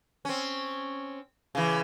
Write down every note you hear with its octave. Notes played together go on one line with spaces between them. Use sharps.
C4 C#4
C#3 E3